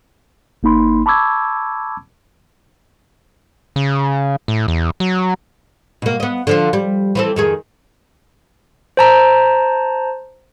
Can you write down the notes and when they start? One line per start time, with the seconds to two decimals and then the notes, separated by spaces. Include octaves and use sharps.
0.63 G1 A#3 D#4 B5 C6
1.06 A5 B5 C#6 D6 E6 G#6
3.76 C#3
4.48 A2
4.68 E2
5.00 F#3
6.02 B2 A#3
6.20 B3 D#5
6.47 D3 F3 F4
6.73 G3
7.15 E3 C4 A4
7.36 F2 D#3 G#4
8.97 C5 A5 A#5